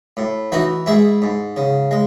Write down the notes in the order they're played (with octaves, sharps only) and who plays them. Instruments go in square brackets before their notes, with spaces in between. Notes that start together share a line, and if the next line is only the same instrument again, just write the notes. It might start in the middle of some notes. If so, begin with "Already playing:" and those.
[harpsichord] A2
E3 D#4 F#4
G#2 E4 G#4
G#2
C#3
G#3